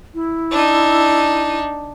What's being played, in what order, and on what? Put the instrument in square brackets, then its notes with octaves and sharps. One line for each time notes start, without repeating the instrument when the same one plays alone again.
[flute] E4
[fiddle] D4 D#4